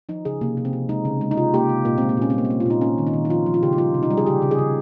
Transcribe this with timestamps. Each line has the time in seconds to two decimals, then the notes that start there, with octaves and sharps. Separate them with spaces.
0.09 F3 D#4
0.25 C#3 G#4
0.41 C3 A#3
0.57 C3
0.65 C4
0.73 C3
0.89 G#3 D#4
1.05 C#3
1.21 G#3
1.31 D#4
1.37 C3 F4
1.54 A#3 G4
1.69 C3
1.85 A#2 A#3
1.98 G#3 C4
2.09 A#3
2.17 A#2 C#4
2.30 C4
2.34 G3 A#3
2.45 C4
2.50 A#3
2.60 F4
2.66 A#2 D#4
2.81 A#3 C#4
2.98 D#3
3.07 D#4
3.13 D#3
3.25 D#4
3.30 F3 F4
3.46 F3
3.54 F4
3.63 C#3 G4
3.73 D#4
3.78 G3 F4
3.94 C3
4.03 D#4
4.11 G3
4.17 G#4
4.26 C#3 G4
4.42 C#3
4.51 G#4
4.58 C#3